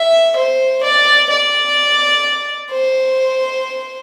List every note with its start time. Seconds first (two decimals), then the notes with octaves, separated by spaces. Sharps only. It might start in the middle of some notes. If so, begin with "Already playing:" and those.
Already playing: E5
0.37 C5
0.84 D5
1.30 D5
2.71 C5